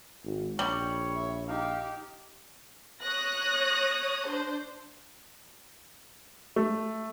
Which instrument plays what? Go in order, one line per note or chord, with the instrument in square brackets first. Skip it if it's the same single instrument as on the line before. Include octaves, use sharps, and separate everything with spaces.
[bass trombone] G#1
[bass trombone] A#1 [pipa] G3 [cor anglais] C#5
[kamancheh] E5
[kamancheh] D#4 G4 [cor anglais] F5
[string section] C#5 D#6 F#6 A#6
D4 C5
[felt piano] A3